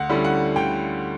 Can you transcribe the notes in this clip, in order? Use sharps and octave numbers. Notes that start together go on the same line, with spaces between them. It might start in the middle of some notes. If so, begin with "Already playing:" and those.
Already playing: D2 F#5
D3 G3 C#4 E4
F#5
D2 G5